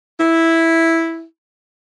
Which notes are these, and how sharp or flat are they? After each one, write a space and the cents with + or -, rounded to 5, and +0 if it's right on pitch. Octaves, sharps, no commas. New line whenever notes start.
E4 -5